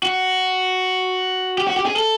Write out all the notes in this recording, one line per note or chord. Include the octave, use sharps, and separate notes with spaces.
F#4
G4
F#4
G4
G#4
A4